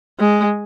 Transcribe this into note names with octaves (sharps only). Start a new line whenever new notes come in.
G#3